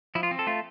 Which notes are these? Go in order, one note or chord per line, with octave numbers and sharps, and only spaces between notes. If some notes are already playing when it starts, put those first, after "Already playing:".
F3 E4
F4
C4
A4
A3 F4